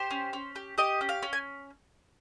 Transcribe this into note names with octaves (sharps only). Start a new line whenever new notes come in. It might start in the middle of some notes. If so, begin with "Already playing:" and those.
Already playing: G4 C5
C#4
C#4
G4
G4 D#5
C#4
F5
C#4
G#5